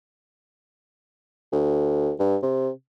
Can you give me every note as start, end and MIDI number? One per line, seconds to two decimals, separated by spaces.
1.52 2.12 38
2.19 2.37 43
2.43 2.70 48